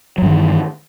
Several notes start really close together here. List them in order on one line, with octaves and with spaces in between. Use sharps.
F#3 G2 D#3 E3